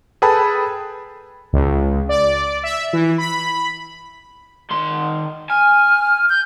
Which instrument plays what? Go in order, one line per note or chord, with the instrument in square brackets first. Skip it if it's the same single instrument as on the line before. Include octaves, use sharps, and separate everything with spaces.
[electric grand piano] G#4 A4 B4 G5 A5 B5
[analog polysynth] C#2
D5
E5
E3
B5
[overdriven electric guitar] D#3 C6
[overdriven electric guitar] G#5 [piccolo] F6
[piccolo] G6